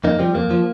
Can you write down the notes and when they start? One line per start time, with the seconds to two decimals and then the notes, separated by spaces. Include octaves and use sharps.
0.04 F2 A#3 D#4
0.19 F3 G3 C4
0.35 F2 A#3
0.51 F3